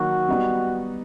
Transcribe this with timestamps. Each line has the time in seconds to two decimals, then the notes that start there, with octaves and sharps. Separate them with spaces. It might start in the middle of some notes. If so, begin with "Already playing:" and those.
Already playing: D#3 F#3 A#3 F#4
0.29 G3 B3 D#4